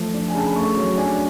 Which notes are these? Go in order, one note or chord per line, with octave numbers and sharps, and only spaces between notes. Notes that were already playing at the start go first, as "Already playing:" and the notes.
Already playing: F3 A3
D4
G#5
C#3 A5
B5
A3 C#6
F#3
D4 G#5